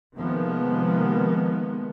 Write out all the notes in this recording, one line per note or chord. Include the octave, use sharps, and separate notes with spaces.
C3 D#3 F3 G#3 A#3 B3